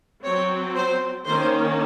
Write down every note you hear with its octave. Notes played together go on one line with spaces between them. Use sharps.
F#3 C4 C#5
C5
D#3 A#3 C#4 C5